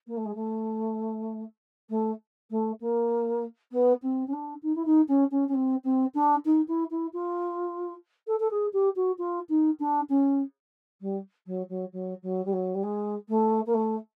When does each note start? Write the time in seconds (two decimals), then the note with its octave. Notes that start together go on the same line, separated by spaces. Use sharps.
0.06 A#3
0.16 A3
0.25 G#3
0.34 A3
1.89 A3
2.50 A3
2.80 A#3
3.71 B3
4.02 C4
4.27 C#4
4.32 D4
4.62 D#4
4.75 E4
4.85 D#4
5.08 C#4
5.31 C#4
5.48 C#4
5.54 C4
5.84 C4
6.14 D4
6.45 D#4
6.67 E4
6.90 E4
7.13 F4
8.27 A4
8.39 A4
8.50 G#4
8.73 G4
8.95 F#4
9.18 F4
9.49 D#4
9.79 D4
10.09 C#4
11.00 G3
11.46 F#3
11.69 F#3
11.92 F#3
12.22 F#3
12.45 G3
12.52 F#3
12.74 G3
12.83 G#3
13.28 A3
13.66 A#3
13.74 A3